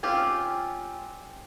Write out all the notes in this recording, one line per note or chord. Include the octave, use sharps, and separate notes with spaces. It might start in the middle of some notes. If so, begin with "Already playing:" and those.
C4 C#4 F4 G4